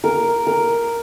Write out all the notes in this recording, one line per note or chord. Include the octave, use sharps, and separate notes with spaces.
A#4
A#4